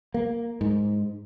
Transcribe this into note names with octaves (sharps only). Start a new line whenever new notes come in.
A#3
G#2